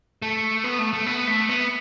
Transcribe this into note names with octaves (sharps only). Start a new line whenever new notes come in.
A3
B3
A3
A3
B3
A3
B3